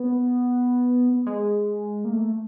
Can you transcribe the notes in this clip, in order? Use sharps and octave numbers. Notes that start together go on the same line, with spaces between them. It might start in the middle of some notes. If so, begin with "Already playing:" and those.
Already playing: B3
G#3
A#3
A3